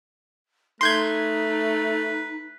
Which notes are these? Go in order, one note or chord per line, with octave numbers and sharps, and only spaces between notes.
A3 D#4 B4 C6 G6 G#6